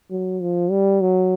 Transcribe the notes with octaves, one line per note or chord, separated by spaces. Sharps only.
F#3
F3
G3
F#3